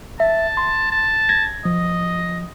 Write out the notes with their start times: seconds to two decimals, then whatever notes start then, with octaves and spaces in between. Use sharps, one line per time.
0.20 E5 A5
0.57 C6
0.92 A5
1.29 G#6 A#6
1.65 F3 D#5